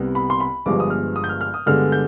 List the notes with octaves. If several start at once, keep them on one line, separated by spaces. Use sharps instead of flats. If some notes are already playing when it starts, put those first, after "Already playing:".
Already playing: C2 C3 G3 B3
B5
C6
B5
G1 G2 F3 G#3 B3 D6
D#6
F6
D#6
G6
F6
F6
D#6
G2 D3 G#3 B3 F6
G6